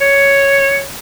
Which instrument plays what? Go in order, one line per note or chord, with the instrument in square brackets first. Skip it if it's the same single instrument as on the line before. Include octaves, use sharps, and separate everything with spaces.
[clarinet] C#5